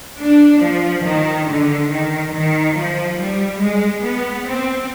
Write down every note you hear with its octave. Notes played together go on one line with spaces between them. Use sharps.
D4
F3
D#3
D3
D#3
D#3
F3
G3
G#3
B3
C4